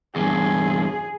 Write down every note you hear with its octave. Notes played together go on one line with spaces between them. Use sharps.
E2 G2 G#4